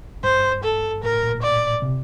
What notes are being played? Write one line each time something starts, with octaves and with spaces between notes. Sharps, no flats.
G2 C5
A4
A2 A#4
A#2
D5
C3